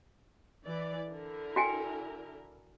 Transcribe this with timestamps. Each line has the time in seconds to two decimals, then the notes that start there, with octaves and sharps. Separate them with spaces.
0.65 E3 D5
1.10 D3 E4 A#4
1.56 F#4 G5 G#5